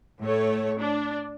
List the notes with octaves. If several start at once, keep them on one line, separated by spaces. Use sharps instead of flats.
A2 A3 C#5
D4